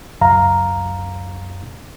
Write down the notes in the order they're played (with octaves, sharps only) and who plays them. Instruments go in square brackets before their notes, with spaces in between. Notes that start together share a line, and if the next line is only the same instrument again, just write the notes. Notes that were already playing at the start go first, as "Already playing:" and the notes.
[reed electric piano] C#2 F#2 F5 A#5